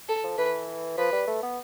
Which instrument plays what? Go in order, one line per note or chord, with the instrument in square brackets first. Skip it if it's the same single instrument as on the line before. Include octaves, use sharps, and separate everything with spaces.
[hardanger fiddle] A4
[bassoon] F3
[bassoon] E3 [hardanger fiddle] B4
[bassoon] F3 [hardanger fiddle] B4
[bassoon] G3
A3
B3